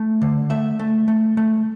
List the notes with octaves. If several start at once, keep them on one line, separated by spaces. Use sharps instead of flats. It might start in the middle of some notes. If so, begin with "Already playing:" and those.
Already playing: A3
D3
A3 E5
A3
A3
A3